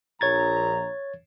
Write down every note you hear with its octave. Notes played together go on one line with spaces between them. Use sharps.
A#1 C#5 A#5 G#6 A6